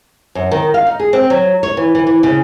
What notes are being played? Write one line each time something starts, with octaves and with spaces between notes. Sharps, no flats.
F#2
D#3
F5
D#4
G#4
C4
F#3
C#5
E3
E3
E3
C#3